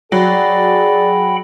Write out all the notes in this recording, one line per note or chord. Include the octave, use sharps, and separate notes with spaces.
F#3 G#4 D5 F#5 G5 B5